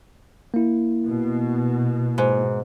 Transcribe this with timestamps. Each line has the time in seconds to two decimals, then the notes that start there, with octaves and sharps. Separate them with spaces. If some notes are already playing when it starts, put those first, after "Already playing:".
0.54 A#3 E4
1.05 B2
2.18 G#2